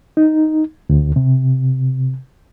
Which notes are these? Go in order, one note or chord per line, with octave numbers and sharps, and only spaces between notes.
D#4
D2
C3